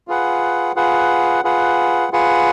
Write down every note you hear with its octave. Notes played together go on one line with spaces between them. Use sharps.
F4 G#4 B4 F#5
F4 G#4 B4 F#5
F4 G#4 B4 F#5
F4 G#4 B4 F#5